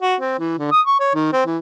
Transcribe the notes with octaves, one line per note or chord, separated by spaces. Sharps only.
F#4
C4
E3
D3
D#6
C#6
C#5
D#3
C4
E3